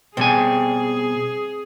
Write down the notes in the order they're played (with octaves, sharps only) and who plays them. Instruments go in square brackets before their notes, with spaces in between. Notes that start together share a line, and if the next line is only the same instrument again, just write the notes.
[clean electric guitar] B2 G3 G#5 [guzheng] C4 [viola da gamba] G#4